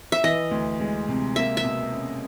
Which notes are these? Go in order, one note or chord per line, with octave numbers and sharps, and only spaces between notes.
E5
E3 D#5
D2
G#3
C3
A#3 E5
E5
B2
C#4